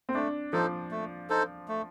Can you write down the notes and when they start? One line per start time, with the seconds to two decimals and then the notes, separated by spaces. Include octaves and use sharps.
0.09 C4
0.15 A3 D4
0.53 F3 D#4 A4 C5
0.91 A3
1.30 D#4 A4 C5
1.68 A3